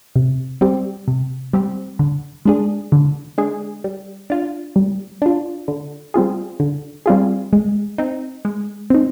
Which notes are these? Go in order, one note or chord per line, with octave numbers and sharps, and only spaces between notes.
C3
G3 C4 G4
C3
G3 C4 G4
D3
G#3 D4 G#4
D3
G#3 D4 G#4
G3
D4 F4
G3
D4 F4
D3
G3 C4 F4 G#4
D3
G3 C4 F4 G#4
G#3
C4 D#4
G#3
C4 D#4